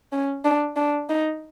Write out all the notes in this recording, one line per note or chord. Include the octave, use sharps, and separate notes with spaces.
C#4
D4
D4
D#4